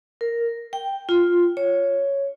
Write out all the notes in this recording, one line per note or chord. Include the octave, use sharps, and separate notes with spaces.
A#4
G5
F4
C#5